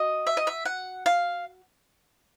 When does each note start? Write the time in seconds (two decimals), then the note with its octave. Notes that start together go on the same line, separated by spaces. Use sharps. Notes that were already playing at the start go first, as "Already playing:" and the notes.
Already playing: F#4 D#5
0.27 E5
0.37 D#5
0.47 E5
0.65 F#5
1.06 F5